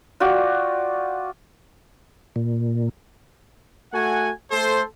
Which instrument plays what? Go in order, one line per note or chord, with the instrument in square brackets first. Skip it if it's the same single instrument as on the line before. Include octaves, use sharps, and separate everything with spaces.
[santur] F4 F#4 D5 G5
[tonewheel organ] A#2
[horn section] A3 F#4 F#5 G#5
A3 A4 C5